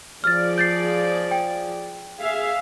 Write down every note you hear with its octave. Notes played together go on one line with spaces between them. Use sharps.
F3 G#4 D5 F6 A6
G6 A6 C7
G5
G#4 E5 F5